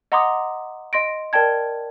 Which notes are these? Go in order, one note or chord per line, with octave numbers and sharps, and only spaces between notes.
D#5 F#5 A#5 C6 D6 D#6
D#5 C6 A#6 D7
A#4 D5 G5 A5 G#6